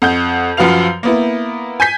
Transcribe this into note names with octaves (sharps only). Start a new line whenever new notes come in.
F2 F#5 G6
F#2 F3 F#4 B4 F5 F7
A#3 B3 E4
G#5 G6 B6